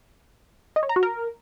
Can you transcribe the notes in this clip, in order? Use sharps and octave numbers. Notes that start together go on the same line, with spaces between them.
D#5
C#5
A#5
F#4
A#4